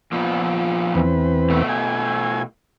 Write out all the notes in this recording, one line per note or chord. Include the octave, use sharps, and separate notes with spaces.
A#2 F3 B3
E2 C4 B4
B2 A3
G#5